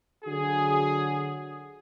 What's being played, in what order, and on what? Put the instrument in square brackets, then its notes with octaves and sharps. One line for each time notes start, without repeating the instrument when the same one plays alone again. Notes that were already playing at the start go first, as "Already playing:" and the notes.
[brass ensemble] D3 F#3 F#4 G#4